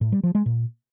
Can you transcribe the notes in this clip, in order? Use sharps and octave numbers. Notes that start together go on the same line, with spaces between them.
A2
G3
F3
G#3
A#2